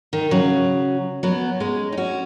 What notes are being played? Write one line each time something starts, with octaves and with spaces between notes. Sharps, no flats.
D#3
C#3 F#3
F#3 B3
G#3 C#4
D#4
C#4 F#4